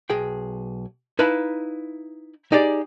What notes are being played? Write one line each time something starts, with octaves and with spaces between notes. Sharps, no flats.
B1 G#4 G5
D#4 E4 B4 F5 A5 B5
D#4 G4 G#4 D5